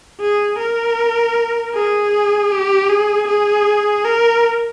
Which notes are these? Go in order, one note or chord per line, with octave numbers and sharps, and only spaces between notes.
G#4
A#4
G#4
G4
G#4
G#4
A#4